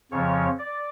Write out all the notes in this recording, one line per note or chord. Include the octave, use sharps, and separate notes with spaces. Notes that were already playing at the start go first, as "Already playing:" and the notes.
F2 C#3 F3 C#5
D5